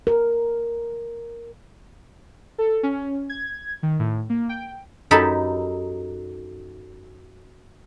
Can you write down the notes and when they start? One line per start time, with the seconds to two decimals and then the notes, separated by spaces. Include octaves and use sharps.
0.07 A#4
2.58 A4
2.83 C#4
3.30 G#6
3.83 D#3
3.99 A2
4.30 A#3
4.49 G5
5.11 F#2 D#4 G4 A4 B5